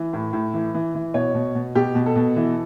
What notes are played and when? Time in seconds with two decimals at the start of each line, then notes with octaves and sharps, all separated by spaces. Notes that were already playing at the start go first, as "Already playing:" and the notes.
Already playing: E3
0.13 A2
0.33 A2
0.54 E3
0.74 E3
0.95 E3
1.14 B2 C#5
1.35 B2
1.55 B2
1.75 B2 G4
1.95 B2
2.06 A4
2.16 B2
2.36 E3